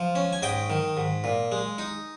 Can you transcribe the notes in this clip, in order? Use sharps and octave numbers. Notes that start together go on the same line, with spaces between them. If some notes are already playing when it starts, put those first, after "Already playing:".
Already playing: F3
C#4
G#5
G#2 D#5 G5
D#3
G#2
A#2
G#3
D#4